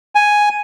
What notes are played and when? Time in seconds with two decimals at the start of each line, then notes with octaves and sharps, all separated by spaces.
0.15 G#5